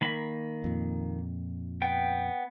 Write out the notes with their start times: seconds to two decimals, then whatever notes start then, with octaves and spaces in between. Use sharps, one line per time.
0.01 D#3 A#3 B5
0.64 F2 A#2
1.82 B3 G5